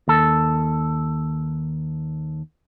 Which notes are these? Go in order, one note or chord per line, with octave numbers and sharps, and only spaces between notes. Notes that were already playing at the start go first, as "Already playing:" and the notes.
D#2 A4